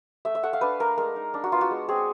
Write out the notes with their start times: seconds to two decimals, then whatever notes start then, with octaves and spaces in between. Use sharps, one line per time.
0.25 A3 E5
0.35 E5
0.43 A3 F#5
0.53 F5
0.61 D4 B4
0.80 A3 A#4
0.98 G#3 A#4
1.16 D#4
1.34 D4
1.44 F#4
1.52 B3 F4
1.61 F#4
1.71 G#3
1.88 C4 G#4